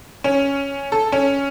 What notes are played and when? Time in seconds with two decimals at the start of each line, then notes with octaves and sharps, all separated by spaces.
0.24 C#4
0.92 A4
1.12 C#4